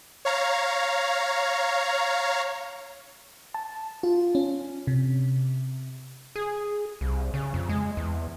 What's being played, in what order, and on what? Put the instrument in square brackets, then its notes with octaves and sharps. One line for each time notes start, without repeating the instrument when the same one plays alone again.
[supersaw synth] C#5 F5 A#5
[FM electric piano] A5
F4
C#4
C3
[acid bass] G#4
C2
C#3
F2
G#3
E2